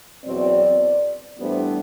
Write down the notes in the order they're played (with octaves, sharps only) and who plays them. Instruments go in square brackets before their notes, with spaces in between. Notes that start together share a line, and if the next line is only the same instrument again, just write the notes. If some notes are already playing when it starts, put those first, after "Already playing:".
[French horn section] E2 B2 F#3 C4 D5
A2 E3 G3 B3 D4 C5